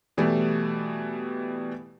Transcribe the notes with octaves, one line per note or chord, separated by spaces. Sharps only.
B2 E3 G3 A3